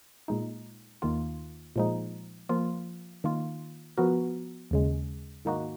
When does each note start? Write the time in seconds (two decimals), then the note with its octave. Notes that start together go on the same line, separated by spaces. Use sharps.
0.28 A#2 G#3 D#4
1.02 D#2 D#3 A#3 F4
1.76 A#2 F3 G#3 D#4
2.49 F3 A#3 F4
3.24 D#3 A#3 F4
3.97 F3 B3 F#4 A#4
4.71 D#2 C#3 G#3
5.45 G#2 D#3 A#3 D#4 F#4